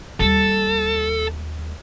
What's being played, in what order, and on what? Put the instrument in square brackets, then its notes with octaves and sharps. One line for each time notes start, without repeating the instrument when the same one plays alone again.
[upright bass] D#2 G3 [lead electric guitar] A4